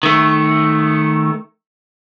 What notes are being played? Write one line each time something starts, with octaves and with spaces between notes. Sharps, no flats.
D#3 A3